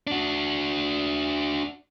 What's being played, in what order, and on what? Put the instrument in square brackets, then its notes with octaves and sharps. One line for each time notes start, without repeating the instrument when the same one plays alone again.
[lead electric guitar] D4 F#4